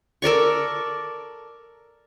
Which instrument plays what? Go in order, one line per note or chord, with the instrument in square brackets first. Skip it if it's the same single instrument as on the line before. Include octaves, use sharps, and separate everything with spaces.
[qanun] A4 A#4 D5 C#6